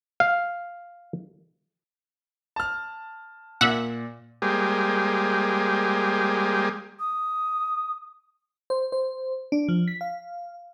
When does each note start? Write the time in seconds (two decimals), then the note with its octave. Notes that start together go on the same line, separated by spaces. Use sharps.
0.20 F5
2.56 A5 F6
3.61 A#2 E5 F#5
4.42 G3 G#3 A#3 G4 G#4 C5
7.00 D#6
8.70 C5
8.92 C5
9.52 D4
9.69 F3
9.88 B6
10.01 F5